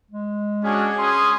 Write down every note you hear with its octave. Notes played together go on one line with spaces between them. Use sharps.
G#3
C#4 D4 F#4 G#4
C#4 C6 D#6